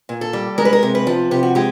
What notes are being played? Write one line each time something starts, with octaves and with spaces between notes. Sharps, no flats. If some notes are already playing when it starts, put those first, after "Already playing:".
A#2
A4
G3
G#3 A#4
B4
A#4
C3
B4
F3
C3 G4
F#4
G#3 G4